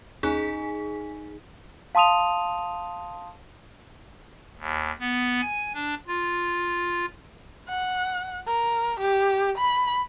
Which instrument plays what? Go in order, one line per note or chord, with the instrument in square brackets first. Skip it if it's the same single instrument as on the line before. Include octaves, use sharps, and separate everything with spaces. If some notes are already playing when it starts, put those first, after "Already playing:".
[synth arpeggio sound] D#2 C#4 F#6 [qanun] D#4 [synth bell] G#4 G#5
[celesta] F5 A5 C6 D#6 D#7 F7
[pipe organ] D#2
B3
G#5
D4
F4
[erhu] F#5
A#4
G4
B5